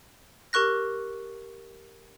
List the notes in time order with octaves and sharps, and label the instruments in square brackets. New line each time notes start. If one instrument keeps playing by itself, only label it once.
[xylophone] G4 A#4 C#6 F#6 A#6